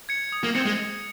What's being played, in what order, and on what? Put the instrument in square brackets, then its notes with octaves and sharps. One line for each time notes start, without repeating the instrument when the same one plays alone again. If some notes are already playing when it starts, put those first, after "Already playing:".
[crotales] G#6 C#7
D#6
[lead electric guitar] A#3
[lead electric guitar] C4 [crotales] C#7
[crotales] G#6
[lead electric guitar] G#3